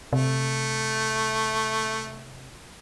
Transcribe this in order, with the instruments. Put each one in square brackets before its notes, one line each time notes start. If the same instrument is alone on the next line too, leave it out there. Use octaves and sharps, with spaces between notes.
[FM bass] C3 [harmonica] A3